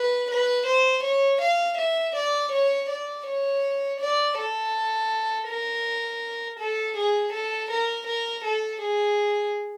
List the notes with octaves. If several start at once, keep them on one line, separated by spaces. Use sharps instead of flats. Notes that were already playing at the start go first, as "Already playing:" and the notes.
Already playing: B4
B4
C5
C#5
F5
E5
D5
C#5
D5
C#5
D5
A4
A#4
A4
G#4
A4
A#4
A#4
A4
G#4